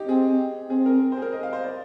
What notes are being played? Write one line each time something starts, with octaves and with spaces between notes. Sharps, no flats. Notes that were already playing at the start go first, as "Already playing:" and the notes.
Already playing: D#4 G4
C4 G#4
C4 G#4
A#4
C5
G#4
A#4
D#5
F5
C5
D5